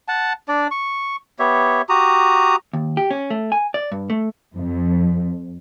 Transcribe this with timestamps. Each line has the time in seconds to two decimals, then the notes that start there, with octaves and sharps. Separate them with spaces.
0.08 F#5 A5
0.48 D4 D5
0.71 C#6
1.39 B3 G4 C#5 E5
1.89 F#4 G4 A#5 D#6
2.73 D#2
2.97 G4
3.11 C#4
3.30 A3
3.52 G#5
3.74 D5
3.92 G2
4.10 A3
4.54 F2